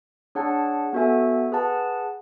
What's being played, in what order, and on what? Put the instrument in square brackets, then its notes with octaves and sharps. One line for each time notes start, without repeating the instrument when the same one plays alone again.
[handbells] D4 G#4 C#5 F#5 A5
B3 F#4 A4 E5 G#5
G#4 B4 F#5 A5